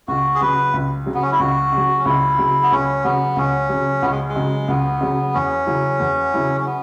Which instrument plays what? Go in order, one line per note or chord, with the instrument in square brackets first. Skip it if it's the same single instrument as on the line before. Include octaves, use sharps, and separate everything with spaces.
[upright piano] C#2 [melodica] F#4
[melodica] G#4
[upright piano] C#3 F#3 [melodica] B4
[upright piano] C#2
C#3 F#3
[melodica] B3
C#4
E4
[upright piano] C#2 [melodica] F#4
[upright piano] C#3 F#3
[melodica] C#4
[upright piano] C#2 [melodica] E4
[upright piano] C#3 F#3
[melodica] B3
[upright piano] C#2 [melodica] C#4
[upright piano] C#3 F#3 [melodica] B3
[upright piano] C#2 [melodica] C#4
[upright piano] C#3 F#3
[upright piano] C#2 [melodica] B3
[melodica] G#3
G#3
[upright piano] C#3 F#3
[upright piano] C#2 [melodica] B3
[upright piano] C#3 F#3
[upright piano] E2 [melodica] C#4
[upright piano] C#3 F#3 E4
E2
C#3 F#3 E4
[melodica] C#4
B3